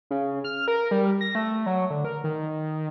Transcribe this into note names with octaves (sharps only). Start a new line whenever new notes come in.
C#3
F6
A#4
G3
A#6
A3
F#3
D3
A#4
D#3